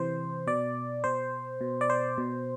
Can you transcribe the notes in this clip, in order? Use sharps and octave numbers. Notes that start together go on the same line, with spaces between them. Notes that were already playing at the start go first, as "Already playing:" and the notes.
Already playing: C3 E3 C5
B2 D5
B2 C5
B2
D5
C5
B2